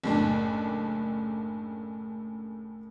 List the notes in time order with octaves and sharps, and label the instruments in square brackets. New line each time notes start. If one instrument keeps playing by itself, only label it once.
[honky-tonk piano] F#1 A2 D4